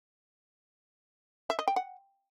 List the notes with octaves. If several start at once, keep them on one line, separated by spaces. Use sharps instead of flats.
E5
D#5
G5
F#5